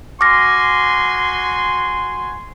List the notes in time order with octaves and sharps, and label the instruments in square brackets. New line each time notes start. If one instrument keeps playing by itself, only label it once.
[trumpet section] F#4 G#5 C6 [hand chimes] D6 F6 A#6